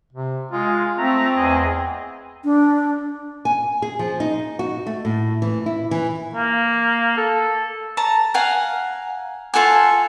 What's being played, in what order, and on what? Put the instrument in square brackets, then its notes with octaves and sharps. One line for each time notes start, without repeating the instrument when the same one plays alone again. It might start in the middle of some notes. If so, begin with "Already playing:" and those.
[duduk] C3
[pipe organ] G#3 [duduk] F4
[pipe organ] A3 A#5 [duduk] C4
[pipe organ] E2 G#4 D#5
[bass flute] D4
[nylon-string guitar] G#5
G#4
F3
D#4
F#4
A3
A2
E3
E4
E3
[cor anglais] A#3
A4
[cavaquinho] A5 A#5
F5 F#5 G#5 A#5
F4 A4 F#5 G#5